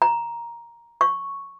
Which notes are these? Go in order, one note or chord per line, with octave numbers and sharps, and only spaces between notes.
A#5
C#6